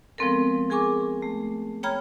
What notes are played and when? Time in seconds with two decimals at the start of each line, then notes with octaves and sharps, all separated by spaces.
0.18 F3 G#3 B3 C4 A4 A#4
0.70 G#4 A#4 G#5 C#6 D6
1.22 A3
1.83 C#5 G5 A#5 B5 F6 G#6